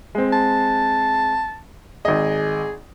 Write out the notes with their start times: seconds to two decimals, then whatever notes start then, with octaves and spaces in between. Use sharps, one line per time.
0.15 G#3 C4
0.33 A5
2.05 G#1 G#4 D#5